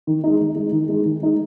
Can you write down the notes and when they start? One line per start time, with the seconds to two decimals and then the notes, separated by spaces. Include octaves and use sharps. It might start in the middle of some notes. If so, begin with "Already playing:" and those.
0.07 D#3
0.24 G#3 D#4
0.40 D#3
0.55 G#3 D#4
0.72 D#3
0.89 G#3 D#4
1.05 D#3
1.22 G#3 D#4